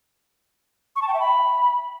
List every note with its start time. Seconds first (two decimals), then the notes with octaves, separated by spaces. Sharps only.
0.96 C#6
1.02 A5
1.08 G5
1.14 E5
1.20 B5